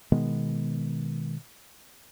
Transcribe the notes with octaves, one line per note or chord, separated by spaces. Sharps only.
B2 D#3 G#3 B3